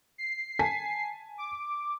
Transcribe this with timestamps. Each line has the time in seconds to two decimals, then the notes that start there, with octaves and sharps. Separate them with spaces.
0.18 C7
0.59 G#5 A5 B6
1.38 D6